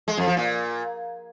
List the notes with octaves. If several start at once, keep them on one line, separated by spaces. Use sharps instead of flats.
G#3
F2
F3
A#2